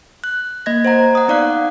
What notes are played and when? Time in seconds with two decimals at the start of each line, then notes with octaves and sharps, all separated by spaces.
0.24 F#6
0.66 A#3 D#5 G#6 A#6
0.85 C5 F#5 A#5
1.15 F#5 D#6
1.28 B3 D#4 D5 F5 F#5 F#6